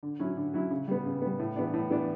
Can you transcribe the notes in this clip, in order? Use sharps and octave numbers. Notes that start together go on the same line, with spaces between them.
D3
F#3 C#4 E4
D3
F#3 C#4 E4
C#3
G3 B3
C#3
G3 B3
A2
E3 B3 D4
A2
E3 B3 D4